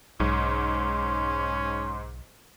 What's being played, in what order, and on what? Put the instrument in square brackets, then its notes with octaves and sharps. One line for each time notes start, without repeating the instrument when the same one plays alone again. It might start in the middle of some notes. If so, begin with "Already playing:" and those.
[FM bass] B1 [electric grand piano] G#2 [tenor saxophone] C#4 [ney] C6